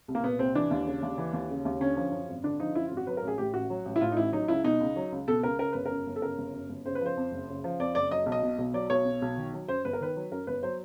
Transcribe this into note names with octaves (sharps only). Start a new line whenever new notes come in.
C2
A#3
A#2 B3
C2 C4
E3 D4
D#2
C#3
D#2
E3
D#2
C#3
D#2
D3 C#4
F3
F#2
G#1
D3 D4
F3 D#4
F#2 E4
F4
G#1
F#4
F#3 B4
A#4
A1
G#4
A2 G4
A1 F#4
F#3
A1
E4
A2 F4
D#4
A1 E4
F#3 D#4
C#2 E4
B2 D#4
C#2
F#3
C#2
B2 A4
C#2 A#4
C#3 A#4
G1 B4
F#2 A#4
G1
A4
C#3 A#4
G1
F#2
G1
C#3 C5
B4
F3 C5
F2
F#1
C#3
F3
F2 D5
F#1 D5
F#3 D#5
B1
D#5
B2
B1
F#3 D5
B1 C#5
B2
B1
D#3
F#3
F#2 C5
G1 B4
A#4
D#3 B4
F#3
F#2 A#4
G1 B4
F#3 C5